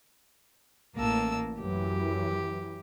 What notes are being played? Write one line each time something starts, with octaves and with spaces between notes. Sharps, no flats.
A1 A#3 A5 E6
F#2 E3 F#3 G4